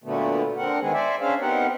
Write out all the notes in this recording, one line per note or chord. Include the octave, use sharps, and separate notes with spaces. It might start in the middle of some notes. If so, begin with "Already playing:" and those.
A#2 D3 F#3 A3 B3
D3 C4 A#4 F#5
D#3 G#3 B3 C4 G#4
C5 D5 E5 G#5
C#4 D4 G#4 C5 E5 F5
B3 C4 D#4 G4 A#4 F#5